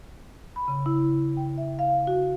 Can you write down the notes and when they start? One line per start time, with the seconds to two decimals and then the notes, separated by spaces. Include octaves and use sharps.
0.56 B5
0.68 C#3
0.86 E4
1.37 G5
1.58 E5
1.79 F5
2.07 F#4